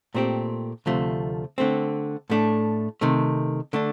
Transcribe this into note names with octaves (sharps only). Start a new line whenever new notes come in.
A#2 A3 C4 G4
D2 C3 F3 A3
D3 A3 C4
A2 A3 D4
C3 D#3 A3
D3 A3 D4